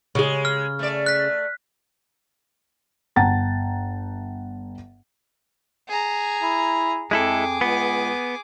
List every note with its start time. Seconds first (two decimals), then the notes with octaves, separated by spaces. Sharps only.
0.15 C#3 G#3 G#4
0.45 F6
0.79 A3 D5
1.06 F#6 B6
3.16 G1 F#5 G5 A5 A#5 A6
5.88 G#4 A#5
6.42 E4
7.11 F2 G#3 E4 G#4 A4 D6
7.61 C#2 B3